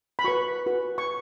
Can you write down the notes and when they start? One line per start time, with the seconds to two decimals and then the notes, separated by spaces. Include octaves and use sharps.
0.19 B5
0.24 F#4 B4 C#6
0.66 F#4 B4
0.98 C#6